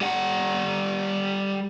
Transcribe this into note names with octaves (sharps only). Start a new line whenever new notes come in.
G3 F#5